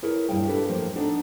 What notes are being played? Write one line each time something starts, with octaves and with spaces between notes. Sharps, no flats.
E4 G#4 A#4 B4 C#5
G2 A#2 E4 C#5 F5 G5
D4 G4 A4 B4 D5
A2 F3 A#3
B3 D4 D#4 A4 D5